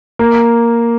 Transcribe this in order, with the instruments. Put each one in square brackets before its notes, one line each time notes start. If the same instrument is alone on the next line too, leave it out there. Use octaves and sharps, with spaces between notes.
[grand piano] A#3